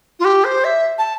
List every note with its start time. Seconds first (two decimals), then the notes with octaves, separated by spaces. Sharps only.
0.19 F4
0.24 G4
0.44 C5
0.64 E5
0.98 A5